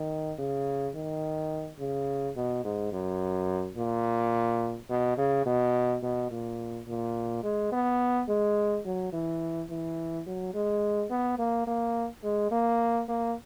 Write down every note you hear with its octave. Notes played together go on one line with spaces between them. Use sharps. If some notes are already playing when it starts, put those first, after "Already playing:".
Already playing: D#3
C#3
D#3
C#3
B2
G#2
F#2
A#2
B2
C#3
B2
B2
A#2
A#2
G#3
B3
G#3
F#3
E3
E3
F#3
G#3
B3
A#3
A#3
G#3
A#3
A#3